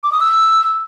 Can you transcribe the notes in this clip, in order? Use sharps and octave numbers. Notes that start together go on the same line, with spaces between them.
D6
D#6
E6